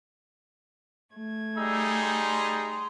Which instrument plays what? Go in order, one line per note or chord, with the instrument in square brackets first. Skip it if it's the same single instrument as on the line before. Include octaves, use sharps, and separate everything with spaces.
[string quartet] A3 G#6
[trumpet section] G3 D#4 G#4 [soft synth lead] E6
[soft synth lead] C6